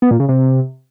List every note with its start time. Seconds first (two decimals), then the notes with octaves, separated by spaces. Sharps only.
0.02 B3
0.11 A#2
0.20 C#3
0.29 C3